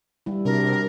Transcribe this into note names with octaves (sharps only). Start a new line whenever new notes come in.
G3 E4
C3 D4 F#4 A#4